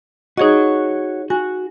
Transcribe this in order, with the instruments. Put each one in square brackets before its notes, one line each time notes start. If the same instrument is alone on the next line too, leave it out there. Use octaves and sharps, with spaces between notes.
[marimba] D#4 G#4 D#5 [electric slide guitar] F#4 C#5
[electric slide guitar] F#4 [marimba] G#5